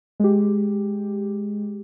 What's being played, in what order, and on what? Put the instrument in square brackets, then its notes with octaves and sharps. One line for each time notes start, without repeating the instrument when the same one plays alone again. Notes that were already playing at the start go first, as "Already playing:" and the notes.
[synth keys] G#3 G4